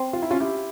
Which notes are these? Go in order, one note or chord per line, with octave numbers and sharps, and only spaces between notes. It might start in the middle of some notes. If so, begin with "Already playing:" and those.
Already playing: C4
F4
E4
C#4 F4
E4 G4